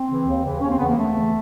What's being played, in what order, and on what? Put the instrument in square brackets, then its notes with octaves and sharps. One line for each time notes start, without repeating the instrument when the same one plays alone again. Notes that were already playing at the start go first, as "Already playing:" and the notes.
Already playing: [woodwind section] C4
C#3 E3
D#2
C#3 E3
D#2 C#4
C4
C#3 E3 B3
A#3
D#2 A3
C#3 E3